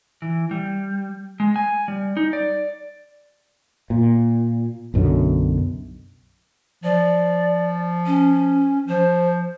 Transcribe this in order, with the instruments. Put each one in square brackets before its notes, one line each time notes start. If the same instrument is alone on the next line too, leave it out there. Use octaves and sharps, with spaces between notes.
[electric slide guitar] E3
G3
G#3
G#5
G3
D#4
D5
[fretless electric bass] A#2
B1 F#2 B2 D3
[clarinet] F3 [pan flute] D5
[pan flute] C#4
[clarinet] F3 [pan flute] C5